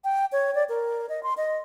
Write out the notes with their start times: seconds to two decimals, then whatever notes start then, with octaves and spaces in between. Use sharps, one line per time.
0.04 G5
0.32 C#5
0.55 D5
0.69 A#4
1.09 D#5
1.23 C6
1.37 D#5